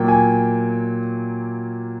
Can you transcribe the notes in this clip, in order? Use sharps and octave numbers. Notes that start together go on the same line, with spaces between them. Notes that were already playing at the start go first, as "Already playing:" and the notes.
Already playing: A#2 F#3 A#3 G5
G#5